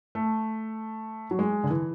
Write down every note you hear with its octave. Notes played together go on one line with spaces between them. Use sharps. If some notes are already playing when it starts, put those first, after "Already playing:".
A3
F#3
G#3
D3
E3